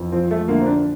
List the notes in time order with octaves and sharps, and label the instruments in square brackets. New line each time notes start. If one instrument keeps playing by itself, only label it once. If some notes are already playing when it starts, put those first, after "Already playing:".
Already playing: [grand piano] F2 E3
[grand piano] F3 [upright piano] C4
[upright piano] A3
[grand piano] D3 [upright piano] A#3
[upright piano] C4
D4